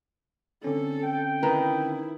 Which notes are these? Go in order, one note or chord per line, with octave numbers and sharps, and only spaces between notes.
D3 C4 C#4 A4
G5
D#3 D#4 E4 B4